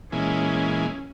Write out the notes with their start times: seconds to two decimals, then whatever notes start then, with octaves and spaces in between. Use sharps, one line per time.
0.12 A#2 E3 G#3 C#4